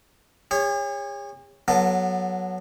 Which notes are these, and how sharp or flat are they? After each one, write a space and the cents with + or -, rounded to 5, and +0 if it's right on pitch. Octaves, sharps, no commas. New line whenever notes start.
G#4 -45 C#5 +0
F#3 +0 B3 -25 A4 +0